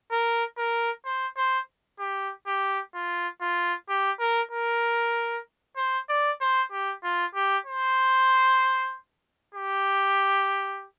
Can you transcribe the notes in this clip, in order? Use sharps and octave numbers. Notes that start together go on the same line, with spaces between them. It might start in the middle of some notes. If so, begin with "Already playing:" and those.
A#4
A#4
C5
C5
G4
G4
F4
F4
G4
A#4
A#4
C5
D5
C5
G4
F4
G4
C5
G4